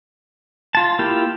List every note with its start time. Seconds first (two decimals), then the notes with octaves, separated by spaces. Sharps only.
0.75 F4 A5
0.99 A#3 E4 F4 G4